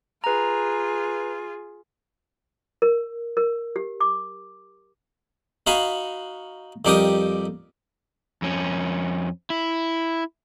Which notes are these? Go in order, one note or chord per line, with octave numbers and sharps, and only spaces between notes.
F4 G#4 B4 A#5
A#4
A#4
G4
D6
D#4 F#4 F5 G#5 B5
F2 G3 D#4 G4 A#4 D#6
F2 C#4
E4